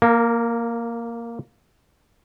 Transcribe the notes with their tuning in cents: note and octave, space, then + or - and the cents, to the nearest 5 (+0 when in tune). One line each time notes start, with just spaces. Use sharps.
A#3 +0 A#4 -35